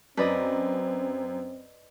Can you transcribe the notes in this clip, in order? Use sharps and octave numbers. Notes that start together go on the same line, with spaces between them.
F#2 C4 B4 D5 D#5